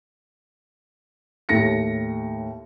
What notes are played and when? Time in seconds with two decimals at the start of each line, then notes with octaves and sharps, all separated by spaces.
1.49 D#2 A2 A#6 C#7